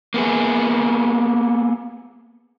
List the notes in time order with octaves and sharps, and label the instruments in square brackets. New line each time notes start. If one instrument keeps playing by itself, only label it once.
[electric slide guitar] A#3 B3 G#4